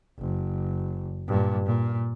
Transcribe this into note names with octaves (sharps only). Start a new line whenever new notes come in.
F#1
G2 A#2
A#2